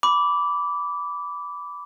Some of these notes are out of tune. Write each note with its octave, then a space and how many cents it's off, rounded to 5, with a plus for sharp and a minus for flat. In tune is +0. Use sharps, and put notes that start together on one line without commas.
B5 +0 D6 -15